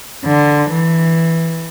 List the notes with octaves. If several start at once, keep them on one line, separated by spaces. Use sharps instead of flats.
D3
E3